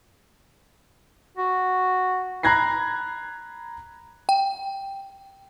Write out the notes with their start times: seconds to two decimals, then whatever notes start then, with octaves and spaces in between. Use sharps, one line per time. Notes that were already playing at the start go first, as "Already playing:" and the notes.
1.37 F#4
2.43 A#5 B5 F#6 G#6 A#6 C7
4.29 G5